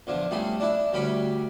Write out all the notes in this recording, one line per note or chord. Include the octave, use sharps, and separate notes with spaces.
E2 D3 F3
C#2 G3 A3 G#4
D4 E4
D2 G3 C#4 B5 D6